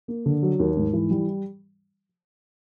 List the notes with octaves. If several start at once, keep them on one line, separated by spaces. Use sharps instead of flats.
A#3
D3
F#3
D#2
G#2
E3
G3